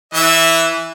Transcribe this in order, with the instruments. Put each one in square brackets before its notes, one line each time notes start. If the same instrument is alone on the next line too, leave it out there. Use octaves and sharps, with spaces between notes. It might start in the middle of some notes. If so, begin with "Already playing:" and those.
[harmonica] E3 E5